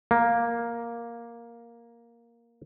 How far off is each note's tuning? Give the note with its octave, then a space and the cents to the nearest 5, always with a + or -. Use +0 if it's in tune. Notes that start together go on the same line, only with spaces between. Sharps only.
A#3 +5